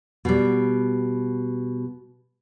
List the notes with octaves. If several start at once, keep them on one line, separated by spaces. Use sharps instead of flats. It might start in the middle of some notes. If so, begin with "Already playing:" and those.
B2 G3